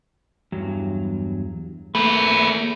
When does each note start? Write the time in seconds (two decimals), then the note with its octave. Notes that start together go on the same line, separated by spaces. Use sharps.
0.52 E2 G2 F#3
1.95 A3 A#3 G#4 B4